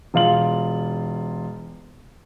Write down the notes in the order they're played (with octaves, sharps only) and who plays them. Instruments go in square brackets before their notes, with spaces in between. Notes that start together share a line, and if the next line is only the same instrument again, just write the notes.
[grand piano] E1 F4 F#7